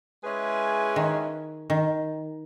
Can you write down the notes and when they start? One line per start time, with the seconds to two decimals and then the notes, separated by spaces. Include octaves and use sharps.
0.23 G#3 C#4 E4 G#4 B4
0.96 D#3
1.70 D#3